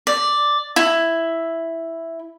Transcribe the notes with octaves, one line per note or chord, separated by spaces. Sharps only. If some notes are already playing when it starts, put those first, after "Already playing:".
D5
E4